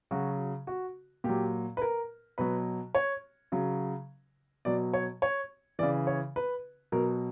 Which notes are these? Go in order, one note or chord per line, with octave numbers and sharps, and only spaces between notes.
C#3 F#3 F#4
F#4
A#2 F#3 G4
B4
A#4
B2 F#3 B4
C#5
C#3 F#3
B2 F#3 D5
C#5
C#5
C#3 E3 D5
C#5
B4
B2 F#3 A#4